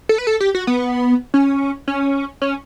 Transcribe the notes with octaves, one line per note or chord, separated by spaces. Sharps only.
A4
B4
A4
G4
F#4
B3
C#4
C#4
C#4